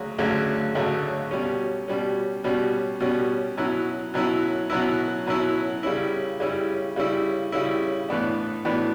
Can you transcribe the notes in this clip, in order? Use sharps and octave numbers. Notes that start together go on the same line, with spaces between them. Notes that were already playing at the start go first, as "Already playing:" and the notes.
Already playing: D2 C#3 F#3
D2 C#3 F#3 A3 C#4
D2 C#3 F#3 A3 C#4
B2 G3 C#4
B2 G3 C#4
B2 G3 C#4
B2 G3 C#4
B2 F#3 C#4 E4
B2 F#3 C#4 E4
B2 F#3 C#4 E4
B2 F#3 C#4 E4
C#3 G3 C#4 E4
C#3 G3 C#4 E4
C#3 G3 C#4 E4
C#3 G3 C#4 E4
A2 E3 B3 D4
A2 E3 B3 D4